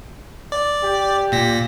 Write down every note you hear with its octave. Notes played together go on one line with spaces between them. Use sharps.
D5
G4
A#2 A#6 B6